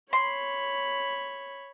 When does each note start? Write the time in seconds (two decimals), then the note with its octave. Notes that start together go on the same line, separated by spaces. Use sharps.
0.13 C#5 B5 C6